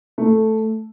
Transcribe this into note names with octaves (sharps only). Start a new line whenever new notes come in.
A3